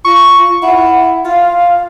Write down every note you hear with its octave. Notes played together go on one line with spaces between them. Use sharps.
F4 C#6
E4 F#5
F4 F5